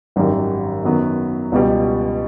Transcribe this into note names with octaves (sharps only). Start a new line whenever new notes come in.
G#1 F#2 D#3 G3
F#2 D#3 F#3 B3
C#2 B2 G3